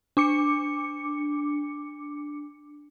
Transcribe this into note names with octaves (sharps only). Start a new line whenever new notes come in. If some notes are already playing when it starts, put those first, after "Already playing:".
D4 D6 C#7